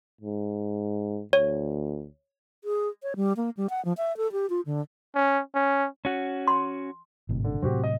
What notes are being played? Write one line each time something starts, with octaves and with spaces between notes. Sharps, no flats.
G#2
D2 C#5
G#4
C#5
G3
A#3
G3
F#5
F3
E5
A4
G4
F4
D3
C#4
C#4
C#4 F#4
C6
G#1 A2 C3
D3
A2 C3 F#3 C4 F#4 G4
D#5